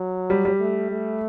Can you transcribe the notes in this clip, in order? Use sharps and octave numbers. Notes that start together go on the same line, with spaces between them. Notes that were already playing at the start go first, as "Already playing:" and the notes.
Already playing: F#3
G3
G3
A3
A3